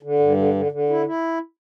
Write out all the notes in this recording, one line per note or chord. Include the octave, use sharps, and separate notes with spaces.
D3
G2
D3
D3
D3
E4
E4